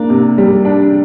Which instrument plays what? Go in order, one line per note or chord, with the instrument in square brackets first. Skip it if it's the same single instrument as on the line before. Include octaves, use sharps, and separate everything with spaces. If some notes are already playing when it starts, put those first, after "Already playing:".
Already playing: [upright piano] A#3 D4
C3
G3
D4